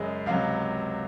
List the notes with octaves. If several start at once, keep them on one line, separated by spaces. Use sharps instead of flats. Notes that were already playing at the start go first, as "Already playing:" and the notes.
Already playing: F#2 C#3 G#3 D#5
C#2 C3 F#3 F5